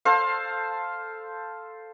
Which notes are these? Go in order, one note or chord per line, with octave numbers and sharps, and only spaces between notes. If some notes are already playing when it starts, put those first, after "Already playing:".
A4 C5 F5